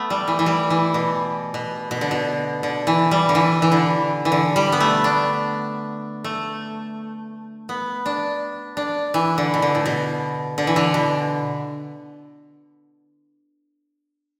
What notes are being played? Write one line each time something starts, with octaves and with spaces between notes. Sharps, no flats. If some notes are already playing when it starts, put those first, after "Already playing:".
Already playing: A3 B3
G3
E3
E3
G3
E3
B2
B2
B2
D3
B2
D3
E3
G3
D3
E3
E3
D3
E3
D3
G3
B3
A3
D4
A3
B3
D4
D4
E3
D3
B2
D3
A2
B2
D3
E3
D3
B2